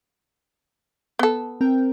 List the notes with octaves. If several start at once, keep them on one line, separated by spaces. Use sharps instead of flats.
B3 A4
C4 A#4 G5